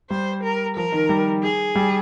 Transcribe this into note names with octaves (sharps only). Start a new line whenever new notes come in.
G3 C5
A#4
F3 A#4
D#3
G3
G#4
G3